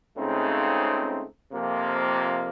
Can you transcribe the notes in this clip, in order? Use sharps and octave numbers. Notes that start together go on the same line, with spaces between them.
C#2 C#3 A3 C4 D#4
F2 C3 F3 A#3